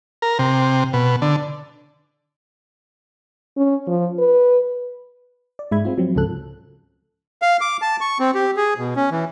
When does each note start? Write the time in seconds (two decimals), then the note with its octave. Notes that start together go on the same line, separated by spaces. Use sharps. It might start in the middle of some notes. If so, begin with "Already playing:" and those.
0.22 A#4
0.39 C3
0.93 B2
1.22 D3
3.57 C#4
3.88 F3
4.19 B4
5.59 D5
5.71 G#2 G#3 E5 B5 G#6
5.85 G#3 C4 F4
5.98 F3 F#3 C4
6.15 C#2 G#2 C#3 F3 A4 F#6
7.42 F5
7.61 D6
7.82 A5
8.01 C#6
8.20 C4
8.35 G4
8.57 G#4
8.78 B2
8.96 C#4
9.11 E3